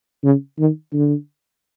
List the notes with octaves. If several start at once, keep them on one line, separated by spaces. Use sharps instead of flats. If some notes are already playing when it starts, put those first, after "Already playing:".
C#3
D#3
D3